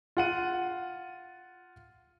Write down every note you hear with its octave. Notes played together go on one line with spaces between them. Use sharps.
F4 F#5 D#7